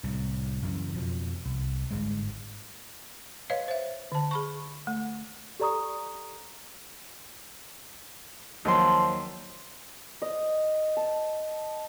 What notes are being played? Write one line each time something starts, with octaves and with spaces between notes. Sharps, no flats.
C2 A2
F#1 F#2 E3
F2 B2 F3
C2
G1 G#2 G#3
B4 C#5 D#5 F5
C5 E5
D3 A5
G#4 B5 C#6
A3
G4 A4 D5 A#5 C#6 D#6
D#2 F3 F#3 C6
D#5
A5